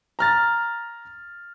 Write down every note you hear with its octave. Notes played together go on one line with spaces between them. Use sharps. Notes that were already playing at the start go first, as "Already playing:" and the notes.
A#5 F6 A6